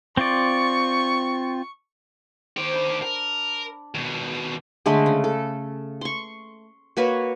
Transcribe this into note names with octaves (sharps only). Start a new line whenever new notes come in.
C4 F4 D5 C#6
D#3 G4 C5
D4 B5
A#4
D#2 B2
D3 G#3 A3 B5
C#3
A4
C6 C#6
A#3 F#4 B4 C#5